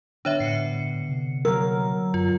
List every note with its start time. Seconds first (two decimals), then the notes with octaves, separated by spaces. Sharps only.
0.25 D3 B3 D4 C#5 E5
0.40 A2 C7 C#7
1.09 C3
1.45 F#3 A#4 E6
2.14 F#2 F4